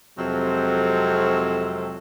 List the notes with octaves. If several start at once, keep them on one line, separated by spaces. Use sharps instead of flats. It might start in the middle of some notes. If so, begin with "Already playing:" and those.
F2 C3 F#3 G#3 C4 A4